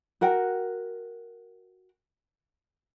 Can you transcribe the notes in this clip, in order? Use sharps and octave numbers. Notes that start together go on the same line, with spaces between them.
F#4 A#4 F#5 G5